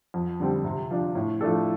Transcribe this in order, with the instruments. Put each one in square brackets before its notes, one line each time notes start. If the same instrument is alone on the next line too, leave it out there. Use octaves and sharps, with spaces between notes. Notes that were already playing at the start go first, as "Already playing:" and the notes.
[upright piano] F2
D3 G3 C4 G4
C3
F3 D4
A2
F3 A3 D4 A4